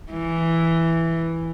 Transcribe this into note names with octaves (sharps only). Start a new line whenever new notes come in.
E3